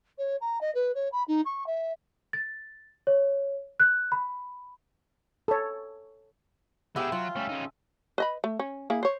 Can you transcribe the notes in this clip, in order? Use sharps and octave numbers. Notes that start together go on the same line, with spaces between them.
C#5
A#5
D#5
B4
C#5
B5
D#4
C#6
E5
A6
C#5
F#6
B5
A4 C#5
G#3 B3 E4 G4 E5 G5 A5
F#3 F4
G3 A3 C#4
C#3 D#4
B4 D#5 B5
A3
C#4
A#3 E4 G#4
C5 C#5